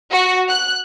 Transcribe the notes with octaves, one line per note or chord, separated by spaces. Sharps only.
F#4
F#6